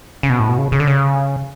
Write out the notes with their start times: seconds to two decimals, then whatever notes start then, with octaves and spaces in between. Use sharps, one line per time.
0.23 C#3
0.30 B2
0.40 A2
0.49 B2
0.58 C#3
0.72 C#3
0.80 D3
0.88 C#3